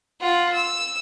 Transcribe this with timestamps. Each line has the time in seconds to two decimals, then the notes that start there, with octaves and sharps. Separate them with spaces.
0.21 F4 F#5
0.52 E6